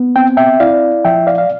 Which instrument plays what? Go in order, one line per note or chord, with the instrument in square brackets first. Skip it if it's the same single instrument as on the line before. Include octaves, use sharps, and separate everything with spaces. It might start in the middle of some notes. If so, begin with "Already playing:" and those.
Already playing: [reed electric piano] B3
C4 G5
E5 G5
E4 D5 F5
F3 E5 G5
D5 F5
F5